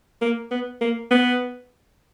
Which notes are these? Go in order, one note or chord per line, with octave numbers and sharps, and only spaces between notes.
A#3
B3
A#3
B3